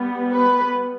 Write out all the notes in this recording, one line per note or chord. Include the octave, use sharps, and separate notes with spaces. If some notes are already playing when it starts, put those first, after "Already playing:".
Already playing: G3 B3
B4